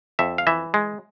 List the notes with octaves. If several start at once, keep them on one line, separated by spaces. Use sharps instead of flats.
F2 E5
F5
E3 E5
G#3